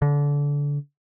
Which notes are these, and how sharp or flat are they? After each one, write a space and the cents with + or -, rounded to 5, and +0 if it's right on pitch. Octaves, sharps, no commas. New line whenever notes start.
D3 -25